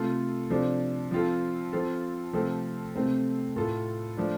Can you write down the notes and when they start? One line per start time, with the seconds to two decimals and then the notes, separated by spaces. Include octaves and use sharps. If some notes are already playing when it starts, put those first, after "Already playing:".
Already playing: C3 A3 F4 A4
0.50 C3 F3 D4 A4
1.11 F3 C4 F4 A4
1.73 F3 C4 F4 A4
2.33 C3 F3 A3 C4 A4
2.95 C3 A3 C4 A4
3.56 A2 A3 F4 A4
4.17 F3 A3 D4